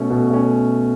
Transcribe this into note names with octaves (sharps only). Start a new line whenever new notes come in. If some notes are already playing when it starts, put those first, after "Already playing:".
Already playing: B2 A3 C#4
B2
A3 C#4